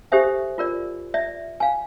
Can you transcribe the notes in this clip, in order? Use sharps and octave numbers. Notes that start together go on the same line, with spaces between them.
G4 A4 C5 E5 G#5
F4 A#4 D5
D5 E5
F5 G#5